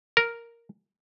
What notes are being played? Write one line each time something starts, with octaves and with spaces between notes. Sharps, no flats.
A#4